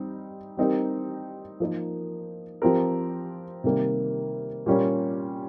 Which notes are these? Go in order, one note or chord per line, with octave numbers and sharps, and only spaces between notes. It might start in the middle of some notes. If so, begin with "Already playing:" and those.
Already playing: G3 C4 D#4
G3 C4 D#4 G4 A#4
F3 A#3 D#4 A#4
F3 C4 G4 A#4
C3 D#3 G3 A#3
A#2 G3 C#4 F4 A#4